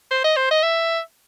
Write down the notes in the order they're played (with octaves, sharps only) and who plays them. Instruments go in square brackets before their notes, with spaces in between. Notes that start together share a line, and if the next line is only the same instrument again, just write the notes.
[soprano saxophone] C5
D#5
C5
D#5
E5